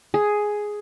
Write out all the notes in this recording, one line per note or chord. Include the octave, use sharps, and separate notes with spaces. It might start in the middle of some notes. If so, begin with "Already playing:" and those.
G#4